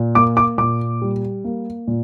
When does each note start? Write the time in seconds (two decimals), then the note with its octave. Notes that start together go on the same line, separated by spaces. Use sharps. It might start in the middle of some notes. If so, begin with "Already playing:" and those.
Already playing: A#2
0.15 A#3 D6
0.37 D6
0.58 A#2 D6
1.02 G3
1.44 A#3
1.87 A#2